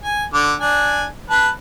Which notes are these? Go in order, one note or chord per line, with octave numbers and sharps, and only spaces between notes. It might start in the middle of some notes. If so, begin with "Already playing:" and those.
G#5
D3 D6
D4 G#5
B4 A5